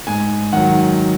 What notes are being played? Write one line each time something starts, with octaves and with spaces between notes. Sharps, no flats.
G#2 G#5
D#3 F#3 F#5